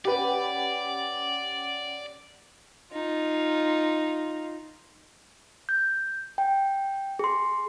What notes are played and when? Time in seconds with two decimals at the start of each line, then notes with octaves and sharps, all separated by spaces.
0.05 C#4 G4 B4 C#5 D5 F#5
2.92 D#4 F4
5.69 G6
6.38 G5
7.19 G#4 C6